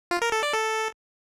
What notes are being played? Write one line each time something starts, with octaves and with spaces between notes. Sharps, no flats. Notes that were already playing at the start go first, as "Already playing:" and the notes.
F4
A#4
A4
D5
A4